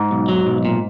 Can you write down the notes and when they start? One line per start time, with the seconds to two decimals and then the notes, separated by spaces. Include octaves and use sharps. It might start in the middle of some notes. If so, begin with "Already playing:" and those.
Already playing: G#2
0.11 B1
0.29 F#3
0.47 B1
0.65 A#2